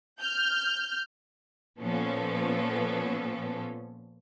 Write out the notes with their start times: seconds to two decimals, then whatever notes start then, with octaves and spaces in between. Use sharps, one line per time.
0.20 F6 G6
1.79 A#2 F3 B3 C#4 A4